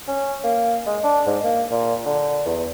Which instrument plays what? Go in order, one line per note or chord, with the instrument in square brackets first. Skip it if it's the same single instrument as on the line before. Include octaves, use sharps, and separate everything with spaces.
[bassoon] C#4
A#3
G#3
D4
G#2
A#3
A#2
D3
E2